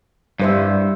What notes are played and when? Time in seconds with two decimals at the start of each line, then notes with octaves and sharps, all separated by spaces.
0.40 G2 G3 C5 E5